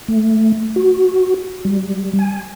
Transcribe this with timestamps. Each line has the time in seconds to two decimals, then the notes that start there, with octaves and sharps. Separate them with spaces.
0.08 A3
0.76 F#4
1.65 G3
2.19 G#5